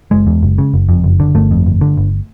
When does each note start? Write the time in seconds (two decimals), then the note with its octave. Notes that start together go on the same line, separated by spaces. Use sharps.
0.11 F#1 G#3
0.27 E2
0.43 F#1
0.58 C#3
0.74 F#1
0.89 F2
1.04 F#1
1.20 D3
1.35 G1 A3
1.51 F2
1.66 G1
1.81 D3
1.97 G1